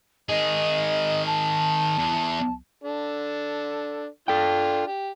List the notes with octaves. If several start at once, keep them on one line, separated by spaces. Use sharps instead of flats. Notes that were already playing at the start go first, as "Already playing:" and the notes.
D#3 G#4 D#5
A5
E2
D4 A4
D4 F4 A4 G5
G4